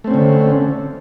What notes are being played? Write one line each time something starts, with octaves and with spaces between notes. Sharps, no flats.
D3 A3 C4 C#4